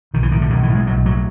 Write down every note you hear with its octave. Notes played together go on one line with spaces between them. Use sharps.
B1 D#3
E3
A2 D#3
D3
B1 D#3
E3
A2
G#3
B1 F#3
A2 F#3